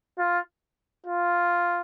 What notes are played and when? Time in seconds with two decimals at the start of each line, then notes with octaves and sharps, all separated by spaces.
0.19 F4
1.06 F4